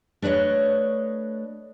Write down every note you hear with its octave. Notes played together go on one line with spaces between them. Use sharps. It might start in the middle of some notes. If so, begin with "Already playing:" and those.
A3 D4 B4 C#5 D#5